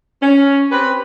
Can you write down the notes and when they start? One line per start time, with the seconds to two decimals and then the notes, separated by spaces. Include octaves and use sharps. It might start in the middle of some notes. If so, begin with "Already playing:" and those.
0.22 C#4
0.71 C4 G4 B4